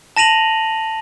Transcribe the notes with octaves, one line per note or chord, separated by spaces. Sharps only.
A5 A#6 D#7 F7 F#7